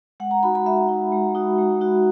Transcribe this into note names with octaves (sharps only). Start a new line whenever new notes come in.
G#3 F#5
A#5
D#4 F#4 B5
B5
G#3 E5
D#4 F#4
G#3
D#4 F#4
G#3
D#4 F#4